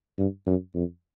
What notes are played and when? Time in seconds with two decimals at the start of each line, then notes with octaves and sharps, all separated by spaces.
0.18 G2
0.46 F#2
0.75 F2